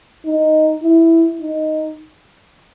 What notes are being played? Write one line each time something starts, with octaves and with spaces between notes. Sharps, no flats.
D#4
E4
D#4